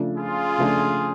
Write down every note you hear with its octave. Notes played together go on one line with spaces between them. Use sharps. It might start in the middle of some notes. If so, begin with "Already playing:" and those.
Already playing: C#3 F3 A3 D4
F4 G#4
C#3 F3 A3 D4